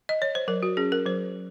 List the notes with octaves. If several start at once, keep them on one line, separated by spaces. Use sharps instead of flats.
D#5
C#5
C5
F#3 A#4
F#4
C#4 G#4
A#4
F#3 C5